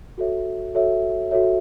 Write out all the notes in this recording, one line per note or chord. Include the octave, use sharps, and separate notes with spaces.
F#4 A4 C#5 E5
F#4 A4 C#5 E5
F#4 A4 C#5 E5